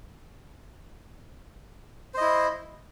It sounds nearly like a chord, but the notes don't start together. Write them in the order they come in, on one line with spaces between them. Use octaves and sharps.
C5 D#5 E4